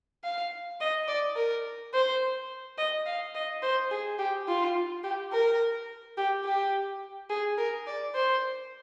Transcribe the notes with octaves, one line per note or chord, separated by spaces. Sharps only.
F5
D#5
D5
A#4
C5
D#5
F5
D#5
C5
G#4
G4
F4
G4
A#4
G4
G4
G#4
A#4
D5
C5